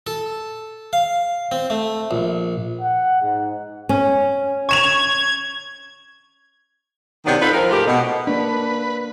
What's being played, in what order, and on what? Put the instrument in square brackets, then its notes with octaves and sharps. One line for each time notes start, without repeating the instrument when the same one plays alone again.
[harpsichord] A4
F5
C4
A3
A#1
[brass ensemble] F#5
G#2
[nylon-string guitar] C#4
[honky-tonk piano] C#6 E7 F7 [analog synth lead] G#6
[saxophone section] C3 D#3 F#3 G#3 B3 D4
C4 D#4 F4 A4 B4
F3 A#4
G#2 A3 A#3 F4 G4
B2
[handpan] A#3 D4 [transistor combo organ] B4